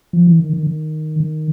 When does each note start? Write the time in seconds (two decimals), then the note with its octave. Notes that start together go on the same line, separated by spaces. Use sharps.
0.13 F3
0.27 E3
0.40 D#3
0.53 D#3
0.67 D#3
1.20 D#3